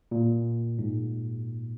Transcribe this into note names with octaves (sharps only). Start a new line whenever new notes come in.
A#2
G#2